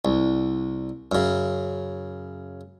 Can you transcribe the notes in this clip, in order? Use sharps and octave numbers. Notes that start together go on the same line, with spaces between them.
C2
F#2 C#3